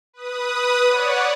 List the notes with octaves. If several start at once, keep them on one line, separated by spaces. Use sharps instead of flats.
B4 D#6
C#5 D5 F#5